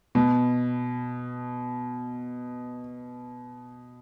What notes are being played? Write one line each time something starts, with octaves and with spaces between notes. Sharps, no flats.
B2